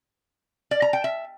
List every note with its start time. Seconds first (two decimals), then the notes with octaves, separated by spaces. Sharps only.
0.71 D5
0.82 A#5
0.93 G5
1.04 E5